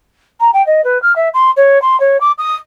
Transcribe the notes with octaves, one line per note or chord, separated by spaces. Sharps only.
A#5
G5
D#5
B4
F6
E5
C6
C#5
C6
C#5
D6
D#6